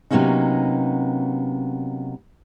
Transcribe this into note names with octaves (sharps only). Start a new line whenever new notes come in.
C3 F#3 A#3 B3 C#4 D#4